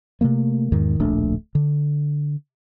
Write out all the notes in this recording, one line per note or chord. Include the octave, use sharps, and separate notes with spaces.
C3 F3 A3 A#3
E2 G#2 D#3
D1 A#1 A3 D4
D3